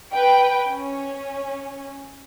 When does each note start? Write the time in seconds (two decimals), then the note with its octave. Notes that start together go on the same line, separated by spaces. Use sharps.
0.12 B4 G5
0.67 C#4